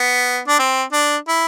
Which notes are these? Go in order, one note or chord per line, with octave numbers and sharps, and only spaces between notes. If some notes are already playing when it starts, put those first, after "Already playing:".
Already playing: B3
D4
C4
D4
E4